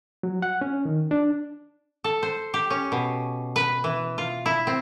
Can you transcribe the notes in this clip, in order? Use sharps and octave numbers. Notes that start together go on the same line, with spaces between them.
F#3
F#5
C#4
D#3
D4
A4
C5
G4
C#4
B2
B4
E3
F4
E4
C4